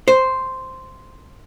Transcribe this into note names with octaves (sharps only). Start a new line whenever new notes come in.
C5